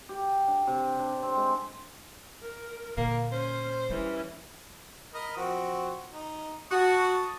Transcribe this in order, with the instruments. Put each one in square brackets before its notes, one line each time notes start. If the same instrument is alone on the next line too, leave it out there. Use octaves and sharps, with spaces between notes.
[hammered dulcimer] G4
D4
C3
D4
C4
G#3
[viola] A#4
[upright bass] A#2 D3 [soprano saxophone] A#3
[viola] C#4 [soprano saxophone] C5
[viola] E3 C#4 [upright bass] G3
[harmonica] A#4 D#5 B5
F3 C4 F#4
D#4
[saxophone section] F#4 [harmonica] A5 C#6 D#6